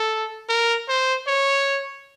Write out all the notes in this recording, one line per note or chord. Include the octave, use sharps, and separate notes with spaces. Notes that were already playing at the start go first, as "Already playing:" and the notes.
Already playing: A4
A#4
C5
C#5